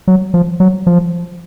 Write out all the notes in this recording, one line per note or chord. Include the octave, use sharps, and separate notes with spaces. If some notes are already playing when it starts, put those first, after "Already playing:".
F#3
F3
F#3
F3